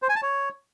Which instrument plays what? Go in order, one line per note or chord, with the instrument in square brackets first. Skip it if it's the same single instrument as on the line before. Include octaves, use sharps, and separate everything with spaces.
[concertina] C5
G#5
A5
C#5